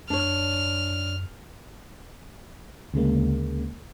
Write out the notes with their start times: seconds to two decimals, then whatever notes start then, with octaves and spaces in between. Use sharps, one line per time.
0.10 F#2 D4 C#5 F6
2.94 D2 C#3 G#3 A#3